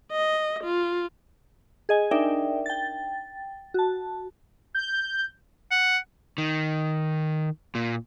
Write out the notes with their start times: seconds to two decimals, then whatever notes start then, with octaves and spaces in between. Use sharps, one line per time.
0.12 D#5
0.63 F4
1.89 G#4 D#5 G#5
2.11 D4 D#4 A#4 D5 E5 G5
2.66 G5 A6
3.74 F#4 A5
4.75 G6
5.71 F#5
6.38 D#3
7.75 A#2